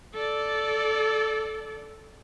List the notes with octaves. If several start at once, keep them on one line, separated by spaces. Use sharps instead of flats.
A4 D5